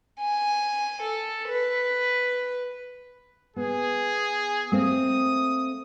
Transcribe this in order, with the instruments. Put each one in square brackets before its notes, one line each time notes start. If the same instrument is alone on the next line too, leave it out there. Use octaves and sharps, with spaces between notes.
[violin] G#5
A4
B4
[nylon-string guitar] B3 [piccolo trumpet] G#4
[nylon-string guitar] A3 A#3 C4 [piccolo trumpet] D#6